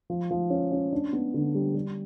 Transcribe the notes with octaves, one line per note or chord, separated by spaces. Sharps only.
F3
F3
C#4
C#4
D4
B3
D3
G3
G3